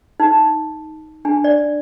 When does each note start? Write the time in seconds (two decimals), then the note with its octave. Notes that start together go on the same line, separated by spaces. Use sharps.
0.20 D#4
1.25 D4
1.44 D5